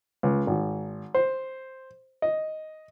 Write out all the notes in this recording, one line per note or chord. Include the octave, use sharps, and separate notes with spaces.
C#2
G#1
C5
D#5